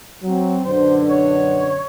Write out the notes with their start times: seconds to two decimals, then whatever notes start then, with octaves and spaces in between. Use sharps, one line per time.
0.23 F#3 C4
0.64 F#2 B2 D3 C5
1.10 C#5